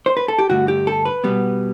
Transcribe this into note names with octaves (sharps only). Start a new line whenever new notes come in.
C5
B4
A4
G4
G2 D3 A3 F#4
G4
A4
B4
B2 G3 B3